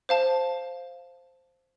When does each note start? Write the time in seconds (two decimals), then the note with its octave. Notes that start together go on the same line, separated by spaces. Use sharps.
0.09 C5 F5 A5